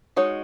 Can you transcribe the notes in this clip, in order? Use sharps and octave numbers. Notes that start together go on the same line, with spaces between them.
G#3 D#4 F#4 C#5